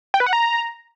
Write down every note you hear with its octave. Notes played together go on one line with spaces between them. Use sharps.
G5
B4
F#5
A#5